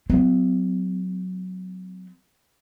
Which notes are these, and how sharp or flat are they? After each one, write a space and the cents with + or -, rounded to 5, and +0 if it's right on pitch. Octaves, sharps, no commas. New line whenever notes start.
F#3 +0 C4 -45